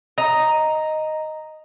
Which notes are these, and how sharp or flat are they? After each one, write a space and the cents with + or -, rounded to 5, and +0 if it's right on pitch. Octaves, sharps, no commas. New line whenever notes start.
D#5 +0 A#5 +0